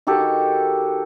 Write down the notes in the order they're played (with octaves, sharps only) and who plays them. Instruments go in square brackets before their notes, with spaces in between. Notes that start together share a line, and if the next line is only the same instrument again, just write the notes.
[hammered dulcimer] D#3 F#4 G4 A4